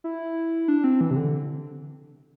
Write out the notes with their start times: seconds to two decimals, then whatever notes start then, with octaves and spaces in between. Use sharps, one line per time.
0.04 E4
0.68 D4
0.84 C4
1.01 E3
1.11 C3
1.16 D3